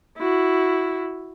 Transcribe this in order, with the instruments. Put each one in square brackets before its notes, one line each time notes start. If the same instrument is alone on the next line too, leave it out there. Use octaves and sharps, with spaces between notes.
[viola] E4 F#4